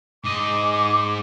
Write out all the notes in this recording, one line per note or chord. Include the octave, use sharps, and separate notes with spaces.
G#2 D#5 D6